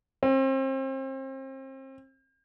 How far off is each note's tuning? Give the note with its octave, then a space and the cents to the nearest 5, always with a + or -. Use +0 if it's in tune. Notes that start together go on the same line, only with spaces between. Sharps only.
C4 +35